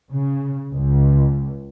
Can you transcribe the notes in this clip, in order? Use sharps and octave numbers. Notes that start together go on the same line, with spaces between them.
C#3
C#2